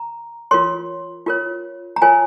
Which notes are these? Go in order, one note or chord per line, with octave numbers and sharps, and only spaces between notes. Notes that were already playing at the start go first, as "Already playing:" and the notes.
Already playing: A#5
F4 A#4 C#5 C6
F4 A#4 C#5
A#5
F4 A#4 C#5 G#5